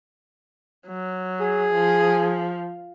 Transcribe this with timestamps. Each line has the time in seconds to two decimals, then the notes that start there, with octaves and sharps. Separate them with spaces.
0.87 F#3
1.40 G#4
1.74 F3